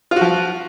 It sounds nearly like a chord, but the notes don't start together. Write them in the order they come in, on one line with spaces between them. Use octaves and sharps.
F4 F#4 F3